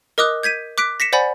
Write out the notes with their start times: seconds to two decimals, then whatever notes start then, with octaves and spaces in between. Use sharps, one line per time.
0.18 A#4 D#5 D6 D#6 F#6
0.43 G6 G#6 B6 D#7
0.78 D6 F#6 B6 D7
1.00 A#6 B6 C#7 E7
1.13 C5 D5 F#5 G#5 B5 A6